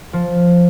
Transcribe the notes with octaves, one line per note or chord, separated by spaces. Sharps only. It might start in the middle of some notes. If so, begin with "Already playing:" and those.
F3